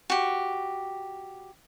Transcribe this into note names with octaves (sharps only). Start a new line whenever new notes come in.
F#4 G4